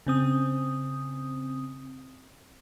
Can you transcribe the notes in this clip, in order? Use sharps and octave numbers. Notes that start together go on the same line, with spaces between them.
C#3 C4 D#6